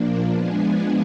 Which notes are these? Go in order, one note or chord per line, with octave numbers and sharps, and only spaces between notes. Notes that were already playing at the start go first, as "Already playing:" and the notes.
Already playing: A#2 F3 A#3 D4
F3 G#3 B3 D4 G#4